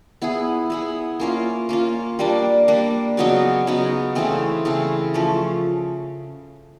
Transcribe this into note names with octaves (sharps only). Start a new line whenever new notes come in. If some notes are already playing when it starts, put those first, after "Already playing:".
B3 E4 G#4
B3 E4 G#4
A#3 C#4 F4
A#3 C#4 F4
G3 A#3 D4
G3 A#3 D4
C#3 F#3 B3 D#4
C#3 F#3 B3 D#4
C#3 E3 A3 C4
C#3 E3 A3 C4
F3 A3 C#4